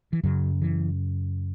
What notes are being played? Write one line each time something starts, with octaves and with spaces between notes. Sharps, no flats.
E3
F#2 C#3 F#3
E3